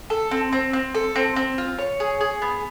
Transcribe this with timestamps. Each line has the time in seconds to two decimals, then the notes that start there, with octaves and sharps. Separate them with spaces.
0.10 A4
0.31 C4
0.52 C4
0.73 C4
0.94 A4
1.16 C4
1.36 C4
1.58 F4
1.78 C#5
2.00 G#4
2.21 G#4
2.42 B3